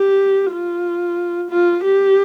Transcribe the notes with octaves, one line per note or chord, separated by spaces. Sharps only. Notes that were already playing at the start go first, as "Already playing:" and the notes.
Already playing: G4
F4
F4
G4